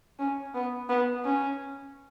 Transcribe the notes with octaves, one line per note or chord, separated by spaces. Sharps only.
C#4
B3
B3
C#4